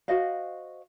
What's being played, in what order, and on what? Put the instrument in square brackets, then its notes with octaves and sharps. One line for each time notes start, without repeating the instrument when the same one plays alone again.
[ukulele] F#4 C5 D#5 F5